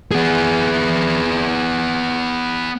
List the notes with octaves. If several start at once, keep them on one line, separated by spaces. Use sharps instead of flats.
B3 G#4